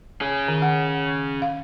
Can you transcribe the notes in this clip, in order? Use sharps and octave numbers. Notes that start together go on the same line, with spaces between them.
C#4 G#4
D#3
F#5
F5